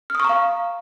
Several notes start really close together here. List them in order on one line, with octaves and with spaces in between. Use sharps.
F6 D#6 C#6 A#5 F5